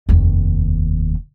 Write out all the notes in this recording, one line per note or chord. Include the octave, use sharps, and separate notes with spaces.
F1 D#2